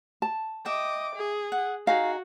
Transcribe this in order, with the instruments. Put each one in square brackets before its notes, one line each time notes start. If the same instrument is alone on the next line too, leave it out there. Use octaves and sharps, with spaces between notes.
[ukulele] A5
[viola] D#5 D6 [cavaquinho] E5 G5
[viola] G#4
[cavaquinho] F#5
[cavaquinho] D#4 G#4 A#5 [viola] F#4 [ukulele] F5